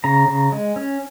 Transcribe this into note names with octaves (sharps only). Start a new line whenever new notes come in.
C#3 A#5
C#3
G#3
C#4